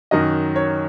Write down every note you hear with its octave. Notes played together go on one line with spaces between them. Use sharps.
F#2 D#3 F#3 D#5
C#5